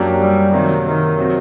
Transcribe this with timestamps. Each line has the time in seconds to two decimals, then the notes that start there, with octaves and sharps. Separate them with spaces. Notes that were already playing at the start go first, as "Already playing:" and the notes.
Already playing: F#2 F#3 A#3 D4 G4
0.21 G3
0.53 C3 D#3 F#3 A#3
0.85 D#3
1.18 C3 F#3 C4 F#4